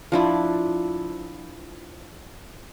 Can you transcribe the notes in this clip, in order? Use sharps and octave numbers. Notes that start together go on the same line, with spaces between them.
F3 D4 E4